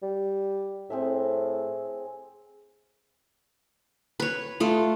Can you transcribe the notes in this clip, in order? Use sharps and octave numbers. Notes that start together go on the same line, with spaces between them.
G3
A2 C4 G#4 E5
B4 C#5
A3 F4